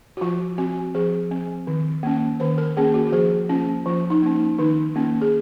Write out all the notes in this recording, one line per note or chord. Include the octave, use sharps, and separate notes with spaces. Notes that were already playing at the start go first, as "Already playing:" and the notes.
F#4
F3 F4
C4 F#4
F3 G#4
C4
D#3
A#3 C#4
D#3 C5
A#4
A#3 C#4 G#4
F#4
F#4
F3 G#4
A#3 C#4 F4
F3 F4
D#4
A#3 C#4
D#4
D#3 D#4
A#3 C#4 F4
G#4